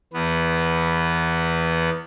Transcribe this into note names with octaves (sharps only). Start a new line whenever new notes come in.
E2 B3